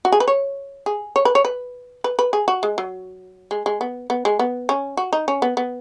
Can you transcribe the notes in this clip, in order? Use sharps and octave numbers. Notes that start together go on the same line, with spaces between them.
F#4
G#4
B4
C#5
G#4
C#5
B4
C#5
B4
B4
B4
G#4
F#4
G#3
F#3
G#3
G#3
B3
B3
G#3
B3
C#4
F#4
D#4
C#4
B3
B3